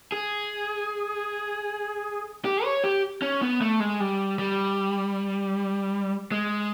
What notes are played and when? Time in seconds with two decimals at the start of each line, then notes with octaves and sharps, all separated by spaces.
0.12 G#4
2.45 G4
2.64 C#5
2.84 G4
3.22 C#4
3.42 B3
3.61 A3
3.80 G#3
4.00 G3
4.39 G3
6.32 G#3